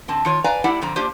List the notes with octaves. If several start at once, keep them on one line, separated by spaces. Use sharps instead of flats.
D3 C4 A5
D#3 F4 C#5
B4 D5 F5 G#5 A#5
A2 E4 G4 D5 F#5
F2 D3 C4 A#5
A#3 D4 F4 G4 C5